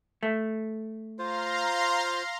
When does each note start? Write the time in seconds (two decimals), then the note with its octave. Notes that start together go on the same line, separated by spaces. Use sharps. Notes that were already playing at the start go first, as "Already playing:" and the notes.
0.23 A3
1.19 F4 C5 F5 A#5 C6